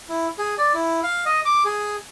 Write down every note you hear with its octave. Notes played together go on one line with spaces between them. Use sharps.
E4
G#4
D5
E4
F5
D#5
D6
G#4